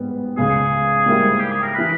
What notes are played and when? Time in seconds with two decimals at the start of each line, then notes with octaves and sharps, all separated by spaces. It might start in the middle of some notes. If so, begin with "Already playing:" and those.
Already playing: G#2 G3 B3
0.37 C#2 C#3 G#3 G#4
1.06 G#2 G3 A#3 E4
1.39 G4
1.51 G#4
1.63 A#4
1.74 E3 B4